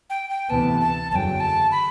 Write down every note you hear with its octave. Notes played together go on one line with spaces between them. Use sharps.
G5
G5
D2 C3 E3 B3 A5
A5
F#1 E2 D3 F#3 G5 A5
A5
B5